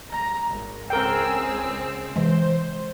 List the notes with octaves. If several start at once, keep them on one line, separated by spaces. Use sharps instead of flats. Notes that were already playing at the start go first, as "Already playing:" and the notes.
A#5
G#1
C#2 C4 G#4 A#4 G5 E6
C3 E3 G#3 C5